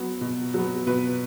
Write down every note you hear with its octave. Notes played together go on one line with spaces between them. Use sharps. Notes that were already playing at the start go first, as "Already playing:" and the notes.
Already playing: F#3 B3
B2
F#3 B3
B2 B4